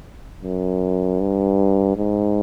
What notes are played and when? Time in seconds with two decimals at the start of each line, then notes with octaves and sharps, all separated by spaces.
0.43 F#2
1.20 G2
1.97 G#2